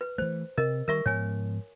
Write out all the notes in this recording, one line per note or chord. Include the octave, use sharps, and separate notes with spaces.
B4
E3 A3 C5
C3 A#4 D#5
D#3 G3 A#4 E5 C#6
G#2 F3 B3 C#5 G#5